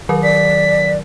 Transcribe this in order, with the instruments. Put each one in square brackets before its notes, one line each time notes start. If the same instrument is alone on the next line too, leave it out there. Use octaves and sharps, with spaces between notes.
[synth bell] D#3 F#3 A#4
[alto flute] D5 [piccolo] B6